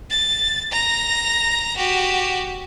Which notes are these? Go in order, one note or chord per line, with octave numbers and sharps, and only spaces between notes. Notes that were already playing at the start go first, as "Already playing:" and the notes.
A6
A#5 A#6
F#4 G4